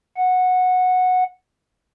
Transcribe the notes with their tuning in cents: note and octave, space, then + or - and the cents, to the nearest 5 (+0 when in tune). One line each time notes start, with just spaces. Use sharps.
F#5 -10